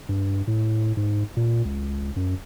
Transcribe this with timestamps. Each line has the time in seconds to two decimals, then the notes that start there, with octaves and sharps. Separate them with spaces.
0.09 G2
0.47 A2
0.97 G#2
1.37 A#2
1.65 C#2
2.16 F#2